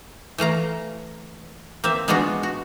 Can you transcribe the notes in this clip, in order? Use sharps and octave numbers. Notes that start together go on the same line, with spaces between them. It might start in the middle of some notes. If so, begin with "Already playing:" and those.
E3 A3 F5 A#5
A#3 C4 E5
G#3 B3 D4 F4 F#4
F#4